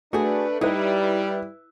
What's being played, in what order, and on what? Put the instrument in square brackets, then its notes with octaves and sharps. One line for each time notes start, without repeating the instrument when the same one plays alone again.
[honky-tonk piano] A3 [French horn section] D4 B4 [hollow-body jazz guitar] F#4 G#4
[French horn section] G3 [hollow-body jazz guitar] D#4 [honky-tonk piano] E4 B4